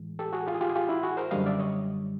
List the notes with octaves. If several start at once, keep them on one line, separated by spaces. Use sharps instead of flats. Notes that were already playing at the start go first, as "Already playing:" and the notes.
Already playing: A2 E3 G#3
G4 A4
F#4 G#4
F4 G4
G#4
F4 G4
G#4
F4 G4
E4 F#4
F#4 G#4
A#4 C5
F#2 D3 G3 D#5 F5
D5 E5
C#5 D#5